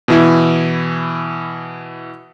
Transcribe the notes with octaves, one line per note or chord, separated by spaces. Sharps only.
B2 E3 E4